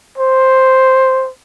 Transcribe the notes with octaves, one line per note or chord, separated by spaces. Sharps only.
C5